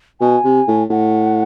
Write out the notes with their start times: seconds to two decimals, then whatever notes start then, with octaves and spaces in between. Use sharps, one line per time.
0.21 B2 G#5
0.44 C3
0.68 A2
0.90 A2 F#5